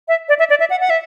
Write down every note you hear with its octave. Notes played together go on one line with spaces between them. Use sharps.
E5
D5
E5
D5
E5
F#5
F#5
E5